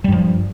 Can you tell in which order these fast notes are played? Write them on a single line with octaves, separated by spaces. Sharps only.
G3 G2 F3